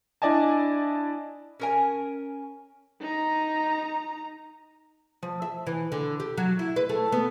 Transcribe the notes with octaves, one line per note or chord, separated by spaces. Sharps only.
D4 E4 D5 D#5 G#5 A5
C#4 A#4 G#5
D#4 A#5
F3
E5
E3
D3
G4
F#3
E4
B4
A3
B3